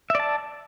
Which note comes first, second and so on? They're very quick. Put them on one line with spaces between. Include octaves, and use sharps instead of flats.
E5 D5 A5